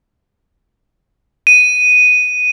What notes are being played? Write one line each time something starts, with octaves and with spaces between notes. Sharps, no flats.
D#7